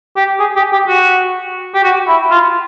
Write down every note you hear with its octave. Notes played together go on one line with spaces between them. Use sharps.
G4
G#4
G4
G4
F#4
G4
F#4
E4
F4